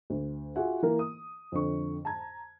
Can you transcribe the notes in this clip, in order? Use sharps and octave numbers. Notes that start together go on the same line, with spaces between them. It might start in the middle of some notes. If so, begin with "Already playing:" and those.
D2
F4 F#4 G#4 E5 F#5 G#5
E3 A#3 A#4
D#6
F2 D3 C#6
A5 A#5 G#6